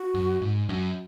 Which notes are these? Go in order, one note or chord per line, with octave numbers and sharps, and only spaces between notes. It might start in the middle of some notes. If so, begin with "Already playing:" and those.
Already playing: F#4
F#2
G#2
F#2